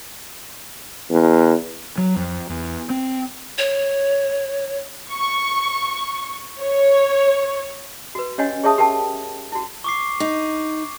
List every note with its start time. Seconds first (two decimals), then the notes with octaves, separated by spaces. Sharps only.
1.11 E2
1.98 F#3
2.16 F2
2.49 E2
2.90 C4
3.58 C#5
5.11 C#6
6.59 C#5
8.15 F#4 B4
8.38 C#4 G4 C#5 D#5 F#5 G#5
8.64 G#4 C#5 E5 A5 D#6
8.78 G4 A#4 G5 A5
9.52 E4 F#4
9.84 C#6 D6 C7
10.20 D#4